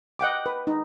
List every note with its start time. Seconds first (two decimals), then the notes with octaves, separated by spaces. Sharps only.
0.19 D#5 F#5 G5 D6
0.46 B4
0.67 D#4